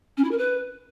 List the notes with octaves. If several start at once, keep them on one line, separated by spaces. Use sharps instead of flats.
C#4
E4
A#4
B4